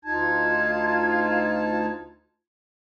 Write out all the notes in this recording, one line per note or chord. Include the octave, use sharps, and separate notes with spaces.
D2 D#4 F4 A5 G#6